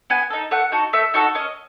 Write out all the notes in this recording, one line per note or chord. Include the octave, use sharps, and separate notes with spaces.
B3 G#5
D#4 A4
A3 F#5
D#4 F#4 A4
A3 E5
D#4 F#4 A4
C#4 D#5